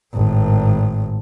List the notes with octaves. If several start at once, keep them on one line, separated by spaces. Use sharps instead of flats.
G#1 A2